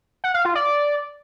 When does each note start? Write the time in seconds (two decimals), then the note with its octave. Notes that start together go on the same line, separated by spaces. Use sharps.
0.24 F#5
0.34 F5
0.45 F4
0.55 D5